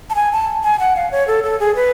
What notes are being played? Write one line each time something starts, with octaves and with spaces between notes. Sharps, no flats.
A5
G#5
A5
G#5
F#5
F5
C#5
A4
A4
G#4
B4